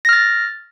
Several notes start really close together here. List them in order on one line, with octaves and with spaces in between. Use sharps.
A#6 F6 A6